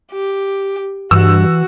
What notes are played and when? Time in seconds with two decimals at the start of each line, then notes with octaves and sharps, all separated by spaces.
0.11 G4
1.11 G2 E3 F#4 E6